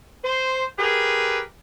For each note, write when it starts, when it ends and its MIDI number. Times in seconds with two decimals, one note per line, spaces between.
0.24 0.64 72
0.79 1.40 67
0.79 1.40 68
0.79 1.40 70
0.79 1.40 71